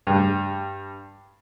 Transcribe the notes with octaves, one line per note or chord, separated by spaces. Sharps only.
G2